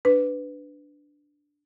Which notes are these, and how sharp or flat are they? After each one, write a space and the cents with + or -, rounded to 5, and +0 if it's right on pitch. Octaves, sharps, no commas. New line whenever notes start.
D4 +0 B4 +15